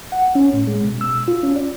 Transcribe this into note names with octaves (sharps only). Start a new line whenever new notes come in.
F#5
C#4
A2
G#3
B2
E6
F4
C#4
D5